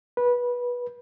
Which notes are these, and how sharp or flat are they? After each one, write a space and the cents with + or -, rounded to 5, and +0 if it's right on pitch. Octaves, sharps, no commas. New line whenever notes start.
B4 -20